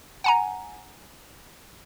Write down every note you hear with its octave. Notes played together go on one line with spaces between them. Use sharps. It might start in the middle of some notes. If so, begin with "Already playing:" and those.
F#5 G#5 A#5